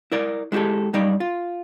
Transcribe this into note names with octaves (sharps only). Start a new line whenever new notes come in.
E4 A#4 D5
G#3 E4 F#4 G4 A4
F#2 G3 D#4 D5
F4